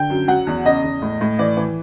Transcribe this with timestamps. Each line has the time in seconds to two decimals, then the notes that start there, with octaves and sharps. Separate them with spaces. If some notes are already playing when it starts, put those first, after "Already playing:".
Already playing: D3 G5
0.10 F#2
0.28 F#3 F#5
0.47 E2
0.65 C#3 D#5
0.83 E2
1.02 A2
1.21 A2
1.39 E3 D5
1.57 E3